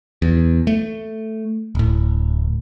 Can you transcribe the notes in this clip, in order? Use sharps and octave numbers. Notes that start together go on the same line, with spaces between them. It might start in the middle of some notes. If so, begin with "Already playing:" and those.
E2
A3
D1 A2